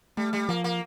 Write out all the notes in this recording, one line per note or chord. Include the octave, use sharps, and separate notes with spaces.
G3 A3
G3
F3 A#3
A#3